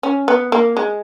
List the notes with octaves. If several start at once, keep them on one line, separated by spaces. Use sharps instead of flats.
C#4
B3
A#3
G#3